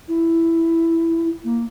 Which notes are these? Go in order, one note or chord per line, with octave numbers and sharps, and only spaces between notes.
E4
A#3